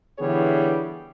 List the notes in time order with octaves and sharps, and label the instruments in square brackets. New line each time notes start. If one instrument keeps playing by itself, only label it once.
[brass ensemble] D3 E3 G3 B3 G#4 C#5